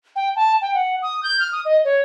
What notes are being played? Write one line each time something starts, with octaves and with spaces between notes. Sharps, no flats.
G5
A5
G5
F#5
D#6
G6
F6
D#6
D#5
C#5